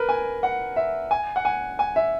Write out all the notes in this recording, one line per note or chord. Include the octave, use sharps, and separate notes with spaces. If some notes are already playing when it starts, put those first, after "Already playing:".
Already playing: A#4 B4
G#5
F#5
E5
G#5
F#5
G#5
G#5
E5